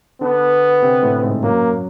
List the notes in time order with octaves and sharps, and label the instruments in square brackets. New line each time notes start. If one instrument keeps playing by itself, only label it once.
[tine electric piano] D3 D4 [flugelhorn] B3
[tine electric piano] C3 C4
A2 A3
G#2 G#3
[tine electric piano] F#2 F#3 [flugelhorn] A#3